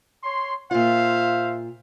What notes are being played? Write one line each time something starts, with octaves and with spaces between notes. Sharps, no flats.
C#5 C6
A#2 F4 C5 E5 F5